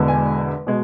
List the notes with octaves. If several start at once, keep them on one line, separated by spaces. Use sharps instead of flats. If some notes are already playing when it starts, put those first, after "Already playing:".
Already playing: E1 E2 D3 G#3
G#5
B2 G#3